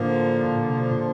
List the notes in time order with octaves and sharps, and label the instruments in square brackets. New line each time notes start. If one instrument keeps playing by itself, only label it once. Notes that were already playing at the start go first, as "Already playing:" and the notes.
Already playing: [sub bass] A2 [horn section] D3 F3 A#3
[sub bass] A2
A#2
C3
B2
A#2